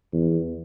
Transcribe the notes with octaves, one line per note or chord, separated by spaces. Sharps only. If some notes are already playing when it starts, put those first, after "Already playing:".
E2